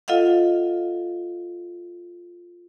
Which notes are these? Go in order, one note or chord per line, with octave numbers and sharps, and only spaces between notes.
F4 A4 D#5 F5 F#5